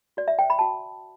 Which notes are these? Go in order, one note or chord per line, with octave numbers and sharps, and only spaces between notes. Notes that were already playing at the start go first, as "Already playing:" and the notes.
F#4 D5
E5
C5 G5
B5
F#4 A5